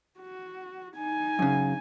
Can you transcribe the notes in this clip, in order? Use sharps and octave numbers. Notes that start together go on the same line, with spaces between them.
F#4
D#4 G#5
F#2 C#3